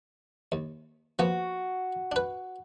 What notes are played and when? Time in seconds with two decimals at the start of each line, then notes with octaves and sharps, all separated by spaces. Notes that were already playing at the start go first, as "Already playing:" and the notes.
0.52 D#2
1.19 F3 A#3 B3 F#4
2.12 D4 B4